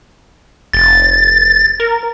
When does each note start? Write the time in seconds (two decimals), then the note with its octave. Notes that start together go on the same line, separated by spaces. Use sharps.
0.73 F1 A6
1.80 A#4